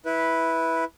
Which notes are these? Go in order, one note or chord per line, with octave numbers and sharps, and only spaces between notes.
E4 B4